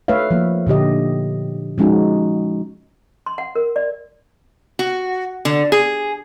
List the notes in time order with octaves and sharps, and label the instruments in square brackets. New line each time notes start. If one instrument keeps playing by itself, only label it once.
[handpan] A3 B4 C#5 E5 F5
F3 A#3
A#2 D3 G4 D#5
F3 G#3 C#4 D#4 F#4
[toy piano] C6
F#5
A#4
D5
[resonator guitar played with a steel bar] F#4
D3
G#4